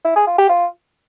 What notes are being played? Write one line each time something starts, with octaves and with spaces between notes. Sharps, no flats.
E4
G#4
F4
G4
F4